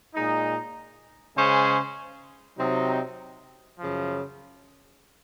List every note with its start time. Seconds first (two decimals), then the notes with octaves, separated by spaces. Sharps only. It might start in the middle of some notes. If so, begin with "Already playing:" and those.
0.14 A#2 G#3 D#4
1.36 C#3 G#3 C#4 G#4 C5
2.57 C3 F#3 C4 D#4
3.79 F#2 C#3 F3